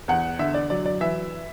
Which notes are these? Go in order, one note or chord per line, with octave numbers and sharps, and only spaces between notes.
E2 F#5
D3 E5
D5
F#3 D5
D5
E3 E5